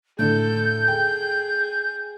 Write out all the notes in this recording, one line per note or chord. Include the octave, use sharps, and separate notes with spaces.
A2 D3 A4 G6
G#4 G5